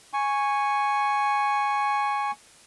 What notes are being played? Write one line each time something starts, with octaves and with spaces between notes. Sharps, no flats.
G#5 C#6